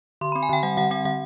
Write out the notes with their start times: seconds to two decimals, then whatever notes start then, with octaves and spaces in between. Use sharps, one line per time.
0.21 D3 C6
0.32 C4 B5
0.43 G#5
0.49 D3 G5
0.63 G3 F#5
0.77 D3 F#5
0.91 C4 F#5
1.05 D3 F#5